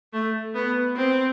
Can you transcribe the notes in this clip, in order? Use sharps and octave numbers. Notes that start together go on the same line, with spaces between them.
A3
B3
C4